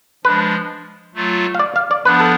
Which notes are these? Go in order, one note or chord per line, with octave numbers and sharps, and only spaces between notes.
F3 G#3 D4 B4
F#3 A3 F4
F5
D5
F5
D5
F3 B3 D4 B4
A4